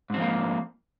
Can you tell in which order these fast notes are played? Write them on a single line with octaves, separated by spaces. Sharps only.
G#2 C4 F3 A#3